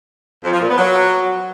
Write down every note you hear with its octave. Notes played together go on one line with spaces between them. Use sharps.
F2
F3
A#2
B3
F#3